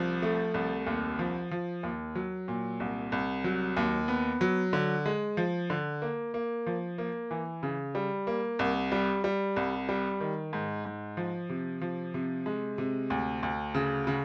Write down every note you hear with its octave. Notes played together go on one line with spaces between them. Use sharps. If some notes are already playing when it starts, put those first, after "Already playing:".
Already playing: C2 F3
A3
C2
D#2
F3
F3
D#2
F#3
A#2
C2
C2
F#3
D#2
B3
F#3
D3
G#3
F3
D3
A#3
A#3
F3
A#3
E3
C#3
G3
A#3
C2
G3
G3
C2
G3
D#3
G#2
G#2
F3
C3
F3
C3
G#3
C3
D2
D2
C#3
C#3